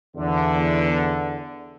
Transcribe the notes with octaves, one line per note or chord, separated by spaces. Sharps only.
E2 D3